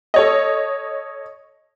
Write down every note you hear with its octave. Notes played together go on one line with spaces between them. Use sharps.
A4 C#5 D#5